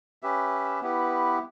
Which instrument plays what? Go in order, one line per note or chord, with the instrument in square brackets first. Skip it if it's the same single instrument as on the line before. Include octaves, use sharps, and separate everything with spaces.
[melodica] C#4 G4 B4 E5
B3 E4 G4 B4